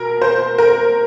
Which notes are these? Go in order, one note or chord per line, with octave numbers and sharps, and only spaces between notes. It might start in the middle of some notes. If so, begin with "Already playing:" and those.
Already playing: B2 A#4
C5
A#4